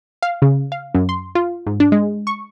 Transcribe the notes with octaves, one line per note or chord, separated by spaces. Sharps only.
F5
C#3
F5
F#2
C6
F4
G#2
D4
G#3
C#6